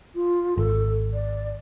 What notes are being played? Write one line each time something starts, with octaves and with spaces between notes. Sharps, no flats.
F4
G#1 A4
D5